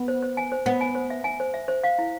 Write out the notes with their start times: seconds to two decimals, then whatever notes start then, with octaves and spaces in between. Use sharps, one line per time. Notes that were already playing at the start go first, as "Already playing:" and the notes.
Already playing: B3
0.08 C5
0.23 C5
0.37 G#5
0.52 C5
0.66 B3 C5
0.81 G#5
0.95 C5
1.10 E5
1.24 G#5
1.40 C5
1.54 E5
1.68 C5
1.84 F5
1.99 E4